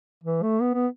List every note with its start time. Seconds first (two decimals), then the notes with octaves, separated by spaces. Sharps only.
0.24 E3
0.43 A3
0.61 B3
0.74 B3